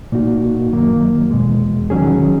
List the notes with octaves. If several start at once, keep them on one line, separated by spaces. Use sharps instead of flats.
A#2 A#3 D#4 F#4
F#2 D#3 F#3 A#3
E2 B2 G#3
D#3 F#3 C#4 G#4